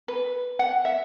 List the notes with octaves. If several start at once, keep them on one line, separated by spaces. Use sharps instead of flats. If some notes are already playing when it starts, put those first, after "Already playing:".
B4
F#5
E5